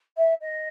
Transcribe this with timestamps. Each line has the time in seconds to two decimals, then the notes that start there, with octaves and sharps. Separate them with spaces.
0.17 E5
0.41 D#5